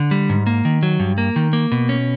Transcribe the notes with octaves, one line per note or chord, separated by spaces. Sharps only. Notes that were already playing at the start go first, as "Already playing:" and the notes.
Already playing: D3
G3
G#2
A#3
D#3
F#3
G2
A#3
D#3
A#3
B2
C#4